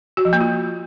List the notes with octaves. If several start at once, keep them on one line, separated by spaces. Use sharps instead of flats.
F#4
F3
A#3
F4